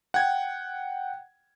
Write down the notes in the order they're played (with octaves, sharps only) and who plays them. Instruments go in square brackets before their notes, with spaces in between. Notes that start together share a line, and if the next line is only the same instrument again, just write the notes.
[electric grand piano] F#5 G5 G#6